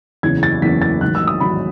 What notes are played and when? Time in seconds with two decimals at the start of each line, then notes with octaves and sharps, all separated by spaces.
0.23 F#1 E2 C#3 G#6
0.43 A6
0.62 F#1 E2 C#3 B6
0.82 A6
1.01 A1 G#2 D#3 F#3 F#6
1.15 E6
1.27 D#6
1.40 A1 G#2 D#3 F#3 B5